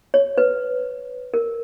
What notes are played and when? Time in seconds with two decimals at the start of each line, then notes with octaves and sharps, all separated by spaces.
0.14 C#5
0.38 B4
1.34 A#4